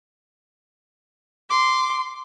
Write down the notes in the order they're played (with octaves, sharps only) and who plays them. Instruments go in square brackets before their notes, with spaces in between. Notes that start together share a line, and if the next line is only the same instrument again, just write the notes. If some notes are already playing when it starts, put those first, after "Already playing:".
[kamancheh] C6 [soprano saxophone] D6